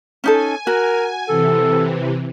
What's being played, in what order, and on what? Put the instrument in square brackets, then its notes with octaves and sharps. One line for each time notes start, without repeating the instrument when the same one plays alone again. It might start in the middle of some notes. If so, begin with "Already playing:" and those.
[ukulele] C#4 D#4 A4 [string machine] G#5
[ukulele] F#4 [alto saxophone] A#4
[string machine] C3 E3 [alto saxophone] A4